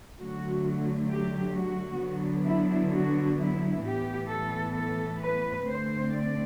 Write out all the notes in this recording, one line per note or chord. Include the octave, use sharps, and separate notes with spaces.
D3 F#3 A3 F#4
G4
F#4
D3 F#3 B3 D4
E4
F#4
E4
A2 E3 B3 G4
A4
A4
B4
D3 A3 C4 C5
D5